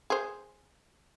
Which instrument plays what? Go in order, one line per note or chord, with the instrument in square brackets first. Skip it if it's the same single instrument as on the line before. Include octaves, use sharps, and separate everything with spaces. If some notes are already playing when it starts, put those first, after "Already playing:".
[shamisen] G#4 C5